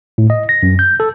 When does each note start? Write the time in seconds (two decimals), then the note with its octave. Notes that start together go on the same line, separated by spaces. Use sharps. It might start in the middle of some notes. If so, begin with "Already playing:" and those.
0.18 A2
0.30 D#5
0.49 A#6
0.63 F#2
0.79 G6
1.00 A4